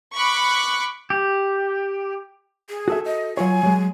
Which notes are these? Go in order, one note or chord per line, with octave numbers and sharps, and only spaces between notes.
B5 C#6 D6 F#6 C#7
G4
G#4
F#4 A4 E5
D#5
F#3 F4 C#5 G#5
F#3 G#3